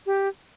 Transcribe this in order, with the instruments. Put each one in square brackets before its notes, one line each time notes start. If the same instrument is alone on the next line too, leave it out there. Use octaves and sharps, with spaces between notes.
[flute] G4